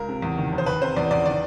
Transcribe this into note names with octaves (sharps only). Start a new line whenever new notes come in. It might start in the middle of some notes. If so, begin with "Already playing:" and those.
Already playing: C#2 A#4
C3
E2
D#3
F1
C5
D#3 B4
C3 C5
E2 D5
E2 D5
D#3 D5